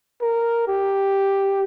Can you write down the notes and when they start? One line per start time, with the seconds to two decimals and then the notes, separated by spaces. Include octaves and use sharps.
0.22 A#4
0.68 G4